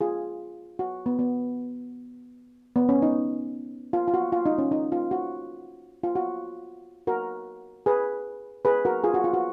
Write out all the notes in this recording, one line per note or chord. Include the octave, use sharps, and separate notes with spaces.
F4 G#4
F#4
B3
B3
B3
C#4
D#4
F4
F4
F#4
F4
D#4
C#4
D#4
F4
F#4
F4
F#4
F#4 A#4
G#4 B4
G#4 B4
F#4 A#4
F4 G#4
F#4
F4
F#4